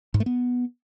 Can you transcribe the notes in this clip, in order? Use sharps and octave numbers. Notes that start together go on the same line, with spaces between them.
G#2
A3
B3